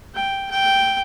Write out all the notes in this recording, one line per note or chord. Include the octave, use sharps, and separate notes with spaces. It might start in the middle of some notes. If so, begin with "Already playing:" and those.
G5
G5